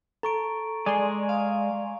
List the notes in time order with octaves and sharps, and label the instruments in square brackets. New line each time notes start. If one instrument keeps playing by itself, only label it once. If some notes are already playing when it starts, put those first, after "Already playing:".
[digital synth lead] A4 [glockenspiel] A#5 C#6 D7
[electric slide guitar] G#3 G#4 [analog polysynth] D5 G#5 C6
[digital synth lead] F5